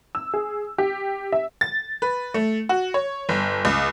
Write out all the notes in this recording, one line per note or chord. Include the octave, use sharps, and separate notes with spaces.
E6
G#4
G4
E5
A6
B4
A3
F#4
C#5
G1
C#2